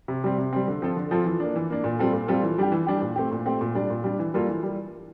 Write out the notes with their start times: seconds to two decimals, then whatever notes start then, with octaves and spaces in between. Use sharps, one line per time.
0.08 C3
0.24 G3 C4
0.38 C3
0.53 G3 C4
0.68 D3
0.82 F3 C4 F4 A4
0.97 D3
1.11 F3 C4 F4 A4
1.26 E3
1.40 A#3 D4
1.56 E3
1.70 A#3 D4
1.84 A#2
1.99 G3 C4 F4 A4
2.14 A#2
2.28 G3 C4 F4 A4
2.43 E3
2.58 G3 D4 G4
2.72 E3
2.87 G3 D4 G4
3.02 A#2
3.16 A3 C4 G4
3.32 A#2
3.46 A3 C4 G4
3.61 A#2
3.75 G3 D4
3.90 A#2
4.04 G3 D4
4.19 E3
4.34 G3 A#3 F4 A4
4.48 E3
4.63 G3